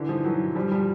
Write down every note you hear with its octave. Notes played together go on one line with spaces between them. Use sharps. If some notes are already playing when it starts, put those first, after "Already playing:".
Already playing: D3 E3
D#3 F3
E3 F#3
F3 G3
F3 G3